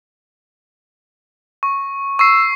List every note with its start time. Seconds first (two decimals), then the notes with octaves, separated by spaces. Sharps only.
1.63 C#6
2.19 C#6 E6 C7